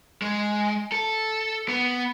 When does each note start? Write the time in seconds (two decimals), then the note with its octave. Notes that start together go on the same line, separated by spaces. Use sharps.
0.22 G#3
0.92 A4
1.68 B3